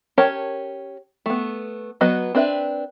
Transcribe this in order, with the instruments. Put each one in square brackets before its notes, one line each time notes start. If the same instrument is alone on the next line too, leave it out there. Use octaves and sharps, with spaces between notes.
[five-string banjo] C#4 G4 A#4 C#5 A5
A3 B3
F#3 B3 B4 D#5
C4 D4 B4 E5